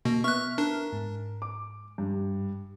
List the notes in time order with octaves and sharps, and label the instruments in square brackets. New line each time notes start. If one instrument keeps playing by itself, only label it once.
[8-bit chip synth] B2 [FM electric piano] A#3
[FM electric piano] B3 E5 F6 [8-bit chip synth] C#6 F#6
[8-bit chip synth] D4 [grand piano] A#4
[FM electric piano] G#2
[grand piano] D6
G2